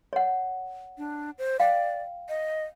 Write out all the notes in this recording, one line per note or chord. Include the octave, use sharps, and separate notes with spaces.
C#5 F#5
D4
C5
D5 F5 G5
D#5